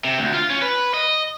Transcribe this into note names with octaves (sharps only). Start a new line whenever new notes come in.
C3
D2
F4
C#4
B4
D#5